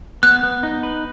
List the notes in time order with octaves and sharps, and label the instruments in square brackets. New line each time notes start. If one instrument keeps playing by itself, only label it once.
[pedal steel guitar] B3 [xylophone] F#6
[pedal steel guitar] B3
D#4
B4